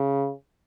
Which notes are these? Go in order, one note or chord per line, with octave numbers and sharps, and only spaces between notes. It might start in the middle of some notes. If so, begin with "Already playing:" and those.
Already playing: C#3